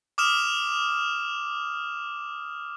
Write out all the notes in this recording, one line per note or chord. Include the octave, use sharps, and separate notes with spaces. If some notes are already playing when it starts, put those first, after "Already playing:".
D6 D#6 F6 E7